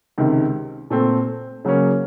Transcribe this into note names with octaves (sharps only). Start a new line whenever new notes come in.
C#2 C3 D#3
A#2 A3 C4
C#3 F#3 A#3 C#4